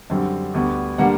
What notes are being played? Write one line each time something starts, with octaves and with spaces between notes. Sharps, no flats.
F#2 D3 G3 C4
D2 D3 G3 B3
D3 G3 A#3 F#5